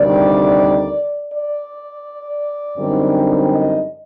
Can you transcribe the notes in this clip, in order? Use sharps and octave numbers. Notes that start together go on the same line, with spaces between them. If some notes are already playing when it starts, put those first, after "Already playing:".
Already playing: D2 C3 D#3 G3 D5
D5
F#2 D3 G3 C4 D#4
D#5